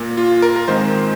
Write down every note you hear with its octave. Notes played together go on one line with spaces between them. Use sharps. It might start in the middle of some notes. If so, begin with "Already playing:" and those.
Already playing: A#2 A#3
F4
A#4
A#4
G#2 D#3 G#3 C4 C5